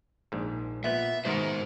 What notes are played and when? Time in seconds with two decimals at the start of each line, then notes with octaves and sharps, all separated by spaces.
0.32 A#1 G#2
0.84 A#2 B3 E5
1.25 B2 D#3 G#3 A#4 C5